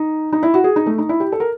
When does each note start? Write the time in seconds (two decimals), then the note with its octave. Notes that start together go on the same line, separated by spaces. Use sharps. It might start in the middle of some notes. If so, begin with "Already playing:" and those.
Already playing: D#4
0.33 D#4
0.43 E4
0.54 F#4
0.64 G#4
0.76 D#4
0.86 A3
0.98 D#4
1.09 E4
1.20 G4
1.32 A4
1.40 A#4